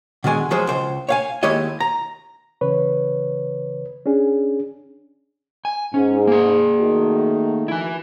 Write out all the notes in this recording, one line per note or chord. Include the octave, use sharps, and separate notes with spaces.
B2 D3 D#3 G#3 G#5
F3 F#3 G#3 G#4 C5
C#2 C5
C#5 F5 G#5
D#2 G#3 E4 G4 C#5 D#5
A#5
C#3 E3 B4 C#5
C#4 D4 G#4
G#5
G#2 C#4
A#3 G#4
D#3 A3 F#4
E4 G#5